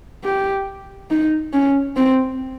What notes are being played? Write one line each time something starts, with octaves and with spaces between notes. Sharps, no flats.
G4
D#4
C#4
C4